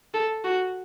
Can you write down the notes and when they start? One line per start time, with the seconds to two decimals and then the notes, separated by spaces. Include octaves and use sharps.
0.14 A4
0.44 F#4